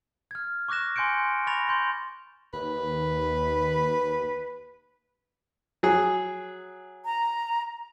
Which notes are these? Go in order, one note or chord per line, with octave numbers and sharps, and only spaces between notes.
F6 G#6
C#6 D6 F#6 A#6 E7
G#5 C6 G6 C#7 D7
B5 C#6 A6 A#6 F7
C6 G6
D#2 B4
F#3 G#4
A#5